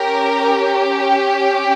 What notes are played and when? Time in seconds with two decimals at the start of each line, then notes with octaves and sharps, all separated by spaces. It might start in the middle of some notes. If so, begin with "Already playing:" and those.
Already playing: C#4 G4 A#4